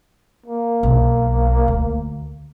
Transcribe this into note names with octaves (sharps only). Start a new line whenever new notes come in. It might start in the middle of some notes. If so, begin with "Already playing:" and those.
A#3
B1
D2